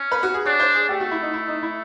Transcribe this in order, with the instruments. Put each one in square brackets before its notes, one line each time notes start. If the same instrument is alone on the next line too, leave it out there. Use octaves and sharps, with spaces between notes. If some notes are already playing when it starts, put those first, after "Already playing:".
Already playing: [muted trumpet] C#4
[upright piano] B4
F#4
G#4
[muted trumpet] D4 [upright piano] C#5
[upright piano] C5
G#4
[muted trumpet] A3 [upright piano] G4
[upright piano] F#4
E4
D#4
E4
D#4
E4